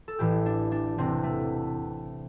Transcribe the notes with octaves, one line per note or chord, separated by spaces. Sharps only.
A4
A1 A2 E3 G4
D4
D4
E1 E2 C3 C4
A3